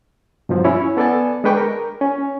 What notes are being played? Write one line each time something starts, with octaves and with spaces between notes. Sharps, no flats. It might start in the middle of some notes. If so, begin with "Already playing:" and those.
G2 B2 F3 F#3
C#4 E4 C#5
B3 A4 D5 G#5 A5
G#3 D4 B4 G5 C#6 D6
A#4
C#4